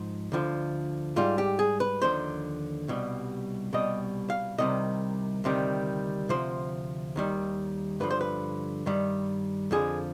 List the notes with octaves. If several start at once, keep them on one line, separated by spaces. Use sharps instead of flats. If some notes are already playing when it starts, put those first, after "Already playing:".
Already playing: G#2 F3 D#4
D2 D3 F3
G#2 G3 F4
G4
G#4
B4
D#2 D3 F3 C5
C2 B2 G3
C2 B2 G3 D#5
F5
C2 C3 D#3 G3 D#5
D2 C3 D#3 G3
D2 C3 F3 C5
D#2 D#3 G3
G2 D3 F3 B4
C5
B4
G2 D#3 G3
F2 D3 F3 G#4